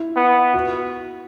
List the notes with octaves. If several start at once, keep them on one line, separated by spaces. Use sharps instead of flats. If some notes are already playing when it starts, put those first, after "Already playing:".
Already playing: E4
B3
F#4